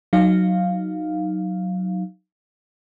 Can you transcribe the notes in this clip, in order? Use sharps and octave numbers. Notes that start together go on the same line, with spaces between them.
F#3 D#4 F5